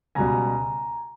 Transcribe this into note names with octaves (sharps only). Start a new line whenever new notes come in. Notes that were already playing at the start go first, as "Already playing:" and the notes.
C#2 B2 G3 G#5 A#5